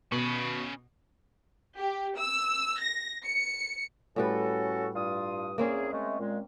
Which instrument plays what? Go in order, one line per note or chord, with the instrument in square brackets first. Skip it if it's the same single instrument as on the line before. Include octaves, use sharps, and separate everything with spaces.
[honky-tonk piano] B2 [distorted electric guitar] C#4 B5
[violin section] G4
E6
A#6
C#7
[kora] A2 G3 B4 [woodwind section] C#4 F#4 A4
[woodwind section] G2 F4 D#6
[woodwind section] E2 G#4 [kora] A#3 C4 C#4
[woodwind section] G#3 A3
A#2 G#3